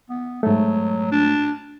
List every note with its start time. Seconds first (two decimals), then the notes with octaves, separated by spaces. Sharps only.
0.10 B3
0.43 G#2 F#3 A3
1.12 D4